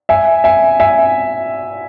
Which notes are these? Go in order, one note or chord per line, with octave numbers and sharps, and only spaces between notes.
E5 G#5
E5 G#5
E5 G#5